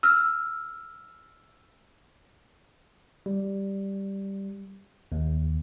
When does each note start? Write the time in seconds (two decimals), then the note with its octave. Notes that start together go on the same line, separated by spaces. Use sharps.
0.03 E6 F6
3.26 G3
5.12 D#2